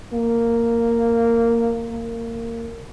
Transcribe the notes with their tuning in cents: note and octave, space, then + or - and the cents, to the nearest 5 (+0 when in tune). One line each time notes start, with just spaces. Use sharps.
A#3 -10
A#3 -20